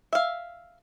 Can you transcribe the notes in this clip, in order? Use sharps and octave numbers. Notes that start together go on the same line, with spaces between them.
E5 F5